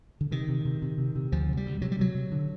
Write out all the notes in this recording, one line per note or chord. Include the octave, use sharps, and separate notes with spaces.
D3
C3 D#3
C3
C3
C3
C3
C3
D2 F3
C3
G3
D2
C3 F#3
G3
C3 F#3
C3
D3